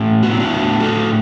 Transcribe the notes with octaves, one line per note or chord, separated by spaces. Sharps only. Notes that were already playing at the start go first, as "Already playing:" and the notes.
Already playing: A2 C#4
B3 F#4
E4
D4 F#4
A2
A2 F#4 A4